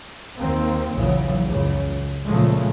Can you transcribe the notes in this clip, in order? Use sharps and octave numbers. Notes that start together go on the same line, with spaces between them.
D#2 D#3 A#3 C4
A#1 D#2 C#3 E3 F#3
C#2 F#2 C#3
A#2 C#3 F3 G#3 A3